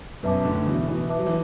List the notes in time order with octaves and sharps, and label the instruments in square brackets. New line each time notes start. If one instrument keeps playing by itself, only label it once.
[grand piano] F#2 B2 [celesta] B4 E5 A5 D6
[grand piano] A2 D3
B2 E3
B2 E3
[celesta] B4 E5 A5 D6
[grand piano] F#3
E3